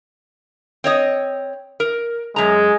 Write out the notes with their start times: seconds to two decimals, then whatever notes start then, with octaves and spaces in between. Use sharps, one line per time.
0.84 C4 C#5 D#5
1.80 A#4
2.36 F#2 G#3 A#5